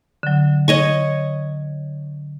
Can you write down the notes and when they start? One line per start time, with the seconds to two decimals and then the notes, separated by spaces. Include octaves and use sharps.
0.23 D3 F#3
0.68 C#5 D#5 C#6